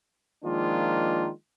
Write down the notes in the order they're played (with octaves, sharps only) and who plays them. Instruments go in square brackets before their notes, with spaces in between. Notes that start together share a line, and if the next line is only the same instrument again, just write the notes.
[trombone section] D#3 F3 G#3 A#3 D4 F4